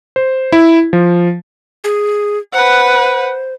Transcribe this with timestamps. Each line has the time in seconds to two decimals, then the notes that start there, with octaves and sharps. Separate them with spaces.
0.16 C5
0.52 E4
0.93 F3
1.84 G#4
2.53 B4 C5 F#5